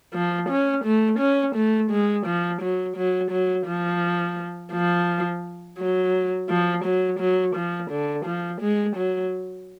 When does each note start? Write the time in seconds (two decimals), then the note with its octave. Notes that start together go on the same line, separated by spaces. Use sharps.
0.14 F3
0.49 C#4
0.85 A3
1.19 C#4
1.55 A3
1.91 G#3
2.26 F3
2.61 F#3
2.96 F#3
3.31 F#3
3.66 F3
4.72 F3
5.78 F#3
6.49 F3
6.84 F#3
7.19 F#3
7.55 F3
7.91 D3
8.25 F3
8.61 G#3
8.96 F#3